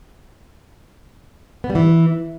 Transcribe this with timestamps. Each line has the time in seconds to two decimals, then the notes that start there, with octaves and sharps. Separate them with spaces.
1.64 B3
1.70 G3
1.75 E3